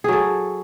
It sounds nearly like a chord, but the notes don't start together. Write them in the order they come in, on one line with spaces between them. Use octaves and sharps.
G#4 F#3 A4